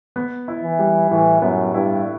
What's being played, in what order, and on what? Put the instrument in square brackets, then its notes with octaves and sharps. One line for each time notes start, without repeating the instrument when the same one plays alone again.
[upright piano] B3
E4
[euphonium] E3
[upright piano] G3
[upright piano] A2 [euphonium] E3
[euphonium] F#2 [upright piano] B3
[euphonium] G2 [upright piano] E4